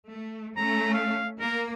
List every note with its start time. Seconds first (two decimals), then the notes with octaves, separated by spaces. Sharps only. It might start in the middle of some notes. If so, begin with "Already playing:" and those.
0.10 A3
0.57 A3 C#4 A#5
0.94 F5
1.40 A#3 A#4